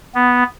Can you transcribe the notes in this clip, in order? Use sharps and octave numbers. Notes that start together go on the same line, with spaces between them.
B3